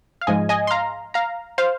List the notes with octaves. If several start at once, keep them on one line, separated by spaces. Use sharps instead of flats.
F5
G#2 F3 G#3 D#5 G#5
D#5 G#5
C6
F5 A#5
F5 A#5
C5 F5